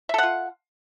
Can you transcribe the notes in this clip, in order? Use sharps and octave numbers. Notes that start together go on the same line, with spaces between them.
F4 A4 E5 F#5